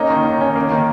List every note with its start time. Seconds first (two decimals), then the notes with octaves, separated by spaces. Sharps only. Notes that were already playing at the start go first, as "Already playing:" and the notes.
Already playing: A#3 C#4 D#4
0.10 D#3
0.24 D#3
0.41 C#4
0.56 A#3
0.72 D#3